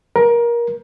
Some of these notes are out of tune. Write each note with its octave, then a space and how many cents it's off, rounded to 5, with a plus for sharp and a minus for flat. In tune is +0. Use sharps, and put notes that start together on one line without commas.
A#4 +20